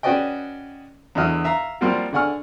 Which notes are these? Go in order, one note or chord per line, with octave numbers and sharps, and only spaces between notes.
C#4 F#4 B4 D5 D#5 G5
E2 D3 E4 F#4 D#5 F6
E5 F5 A#5
F3 G3 A#3 C4 F4 F#4
D3 D5 F#5 G#5 C#6 F6